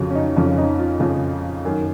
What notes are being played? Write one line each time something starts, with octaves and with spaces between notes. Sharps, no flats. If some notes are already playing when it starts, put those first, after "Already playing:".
Already playing: F2 C#3 F3 F4 F#4
C#4
D#4
F2 C#3 F3 C#4
D#4
F4
F2 C#3 F3
F#2 D#3